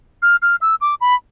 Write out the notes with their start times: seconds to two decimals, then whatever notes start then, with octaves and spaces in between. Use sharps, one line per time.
0.22 F6
0.42 F6
0.61 E6
0.81 D6
1.01 B5